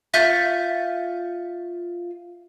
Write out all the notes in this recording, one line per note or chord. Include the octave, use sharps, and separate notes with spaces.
F4 E5 C#6 G6